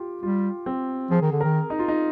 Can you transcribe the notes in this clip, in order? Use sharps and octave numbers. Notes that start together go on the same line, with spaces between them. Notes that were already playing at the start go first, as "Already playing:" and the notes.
Already playing: F4 G4
G3 F4
C4
F3 G#4
D#3
D3
D#3 A#4
D#4
F4
D#4